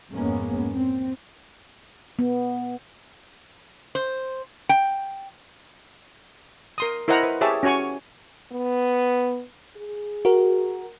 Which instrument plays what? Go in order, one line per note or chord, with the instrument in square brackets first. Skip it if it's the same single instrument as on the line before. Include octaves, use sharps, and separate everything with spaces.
[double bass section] F2 G#2 G#3 A#3 B3 C#4
C4
[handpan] B3
[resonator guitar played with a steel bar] C5
G5
[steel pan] A#4 C6 D#6
E4 A#4 C5 D#5 F#5 A#5
B4
G4 G#4 C#5 E5 A5
C#4 F#4 C#5 G#5 C#6
[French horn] B3
G#4
[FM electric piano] F#4 A#4